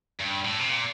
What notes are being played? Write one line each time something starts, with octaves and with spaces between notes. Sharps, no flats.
G2
A2
C3
A#2